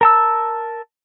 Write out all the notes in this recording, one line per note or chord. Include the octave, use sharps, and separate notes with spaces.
A#4 A5 E6